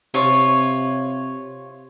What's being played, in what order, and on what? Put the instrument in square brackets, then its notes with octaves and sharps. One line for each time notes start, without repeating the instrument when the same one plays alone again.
[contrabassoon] C3 [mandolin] F4 C#5